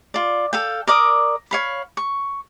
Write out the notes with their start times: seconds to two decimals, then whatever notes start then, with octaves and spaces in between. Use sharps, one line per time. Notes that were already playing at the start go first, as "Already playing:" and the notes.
0.14 F4 D5
0.53 A4 F5 G5
0.87 A#4 D5 D6 D#6
1.51 C#5 F5 B5
1.97 C#6